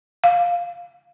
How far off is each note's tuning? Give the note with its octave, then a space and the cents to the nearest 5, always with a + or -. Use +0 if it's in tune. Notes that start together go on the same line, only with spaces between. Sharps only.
F5 +0